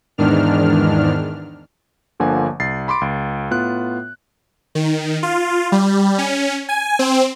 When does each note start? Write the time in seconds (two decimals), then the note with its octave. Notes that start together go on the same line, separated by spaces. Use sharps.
0.18 E2 G#2 D#3 D4 F6
2.20 G1 D3 F3 A#3 F#5 G#5
2.60 C2 A6 C7
2.88 B5 C6 D6 D7
3.01 C#2
3.51 A2 B3 F4 F#6
4.75 D#3
5.23 F4
5.72 G3
6.18 C#4
6.69 G#5
6.99 C4